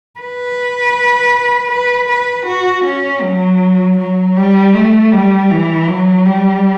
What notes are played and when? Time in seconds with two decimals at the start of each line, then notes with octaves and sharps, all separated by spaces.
0.20 B4
1.71 B4
2.09 B4
2.47 F#4
2.85 C#4
3.22 F#3
3.98 F#3
4.36 G3
4.74 A3
5.12 G3
5.50 E3
5.88 F#3
6.25 G3